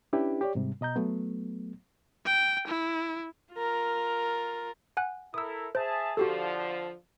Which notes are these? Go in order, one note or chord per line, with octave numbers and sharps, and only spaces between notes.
C#4 D4 E4 G4 B4
G4 C#5 D5
G#2 C3 G3
B2 D#5 A#5 G6
F#3 A3 B3
G5
E4
F4 A#4
F#5 G#5 F#6
E4 A4 A#4 D#6 E6
G#4 C5 E5 A5
D3 F3 F#4 G4 A4